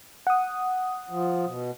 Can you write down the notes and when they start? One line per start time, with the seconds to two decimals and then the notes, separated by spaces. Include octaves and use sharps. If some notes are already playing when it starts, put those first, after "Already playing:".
0.27 F#5 D#6
1.10 F3
1.46 B2